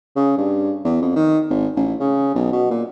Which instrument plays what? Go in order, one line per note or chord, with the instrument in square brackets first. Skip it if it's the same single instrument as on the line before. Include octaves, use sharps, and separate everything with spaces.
[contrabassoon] C#3
G2
E2
F2
D#3
G#1
A1
C#3
B1
B2
A#2